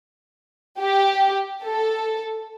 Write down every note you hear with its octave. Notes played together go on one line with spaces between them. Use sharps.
G4
A4